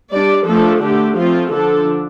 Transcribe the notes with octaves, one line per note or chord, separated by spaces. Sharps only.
G3 D4 D5
F3 A3 D4 A4
D3 A3 D4 G4
F3 A3 C4 F4
D3 F3 D4 A4